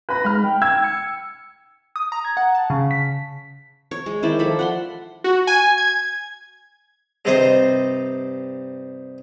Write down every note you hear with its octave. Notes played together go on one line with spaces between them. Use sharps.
B4 B5 A#6
G#3 B5 F6
G5
E6 G#6
C#7
D#6
A#5
G#6
F#5
A5
C#3
B6
C#5
G#3
D#3 E4 C5 D5
F3 A4 E5 B5
F#5 B5 C6
F#4
G#5
G#6
G2 C3 D#4 C5 D#5